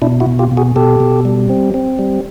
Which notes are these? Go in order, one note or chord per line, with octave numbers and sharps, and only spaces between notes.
B2 D4 E4
E4 F#4
B2
F4 G4
B2
F#4 G#4
B2 G4 A4
B2
G3
C4
C4
G3